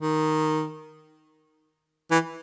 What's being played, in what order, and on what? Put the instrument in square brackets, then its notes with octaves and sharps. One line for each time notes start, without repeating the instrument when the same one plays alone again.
[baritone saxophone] D#3
E3